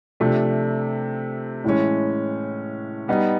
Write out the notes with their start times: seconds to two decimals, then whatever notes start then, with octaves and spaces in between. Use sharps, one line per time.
0.20 C3 F3 A3 D4
1.64 A2 E3 G#3 C#4
3.08 G3 B3 D#4